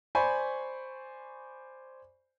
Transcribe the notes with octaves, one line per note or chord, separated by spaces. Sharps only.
C5 D5 G#5 B5 C#6